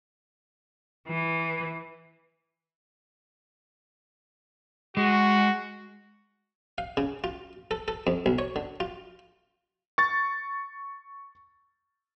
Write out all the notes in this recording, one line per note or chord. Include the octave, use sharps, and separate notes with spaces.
E3
G#3 F#4
F5
C#3
F4
A4
A4
F2
B1
C#5
D3
F4
C#6 A6